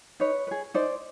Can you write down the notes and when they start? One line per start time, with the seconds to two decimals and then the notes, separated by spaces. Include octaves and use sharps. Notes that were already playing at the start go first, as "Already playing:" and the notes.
0.20 D#4 B4 C#5
0.47 B4
0.51 G#4
0.74 D#4 C5 D5